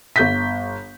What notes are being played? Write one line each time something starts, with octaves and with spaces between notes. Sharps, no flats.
G1 G6 B6